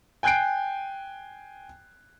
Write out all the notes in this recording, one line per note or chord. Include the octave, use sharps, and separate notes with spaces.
G5 G#5 F#6 G6 C7 D7